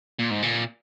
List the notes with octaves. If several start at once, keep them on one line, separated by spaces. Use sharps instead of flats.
A#2
G#2
A#2